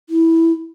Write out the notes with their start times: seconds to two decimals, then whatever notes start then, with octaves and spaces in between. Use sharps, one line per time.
0.09 E4